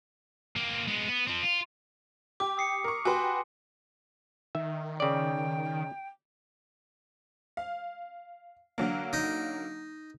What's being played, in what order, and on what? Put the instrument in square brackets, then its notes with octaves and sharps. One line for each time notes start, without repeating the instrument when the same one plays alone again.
[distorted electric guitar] A#3 C4
G#3 B3
B3
F3 C4
F4
[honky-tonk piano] G4 [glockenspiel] D6
[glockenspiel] D#6 C7 C#7
[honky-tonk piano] A#4 C#6
[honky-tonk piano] F#4 G4 B4 [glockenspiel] G#5 C6
[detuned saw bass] D#3 [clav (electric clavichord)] E5
[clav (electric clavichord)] C#3 D5 [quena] G5
[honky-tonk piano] F5
D3 F#3 A#3
[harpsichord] D#4